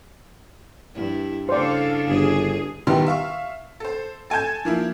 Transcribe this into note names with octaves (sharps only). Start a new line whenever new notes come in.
G2 E4
C#3 D4 E4 A4 C5 D5 F5
G1 G#4
E2 D#3 G3 B3 E4 C6
E5 F5 C#6
A4 C5
A4 G#5 A5 G6 G#6
F3 A#3 E4